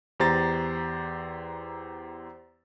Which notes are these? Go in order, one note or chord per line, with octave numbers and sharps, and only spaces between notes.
E2 G4 C5 A#5 A6